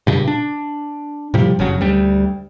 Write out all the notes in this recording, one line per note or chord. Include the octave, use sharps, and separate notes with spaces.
G2 A#2 C#3
D4
A2 C3 F3 G3
F#1 C#3 F#3
D2 G3